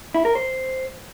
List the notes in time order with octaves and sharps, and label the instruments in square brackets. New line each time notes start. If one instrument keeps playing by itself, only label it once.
[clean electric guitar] E4
A#4
C5